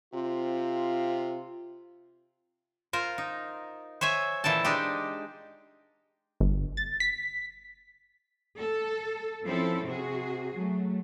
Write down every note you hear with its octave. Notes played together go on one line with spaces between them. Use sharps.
C3 C4 F4
F4 A#4 C5
D#4
C5 C#5 E5 G#5
A#2 E3 A4 G5 A5
G#3 D4 D#4 G4
G1
A6
B6
A4
F3 C4 C#4 E4 A4
C3 F#4 G#4
F#3 A3